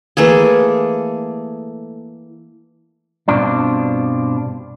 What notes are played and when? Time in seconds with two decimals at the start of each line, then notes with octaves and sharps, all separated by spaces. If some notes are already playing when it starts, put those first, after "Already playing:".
0.17 E3 A3 A#3 G#4
3.28 G2 B2 C4 D4 F4